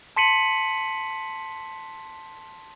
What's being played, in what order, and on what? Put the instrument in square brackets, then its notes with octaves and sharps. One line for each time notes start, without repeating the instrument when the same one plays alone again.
[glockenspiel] A5 C6 B6 C#7 D#7 F#7